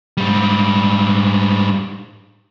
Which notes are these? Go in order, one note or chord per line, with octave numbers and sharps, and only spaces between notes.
G#2 G3